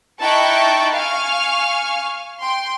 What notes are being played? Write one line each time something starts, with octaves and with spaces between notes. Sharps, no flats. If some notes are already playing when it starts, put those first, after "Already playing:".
D#4 E4 G5 A5 C#6 F#6
F5 G#5 C#6 F6
G5 C6